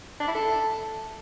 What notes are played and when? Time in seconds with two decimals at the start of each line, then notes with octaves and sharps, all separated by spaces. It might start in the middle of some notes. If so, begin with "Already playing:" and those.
0.20 D4
0.27 E4
0.35 A4